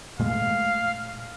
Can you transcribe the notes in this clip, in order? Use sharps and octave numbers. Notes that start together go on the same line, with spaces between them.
A#2 G#3 A3 F5